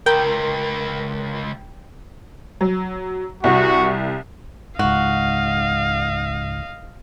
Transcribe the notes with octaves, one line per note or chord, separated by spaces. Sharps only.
C#2 A#4 G5
F#3
C2 F#4
C#2 G#2 F#4 D#5 F5